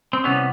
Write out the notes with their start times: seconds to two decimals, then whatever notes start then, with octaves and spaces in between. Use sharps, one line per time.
0.13 C4
0.24 C3 E3 G3 B3 C#4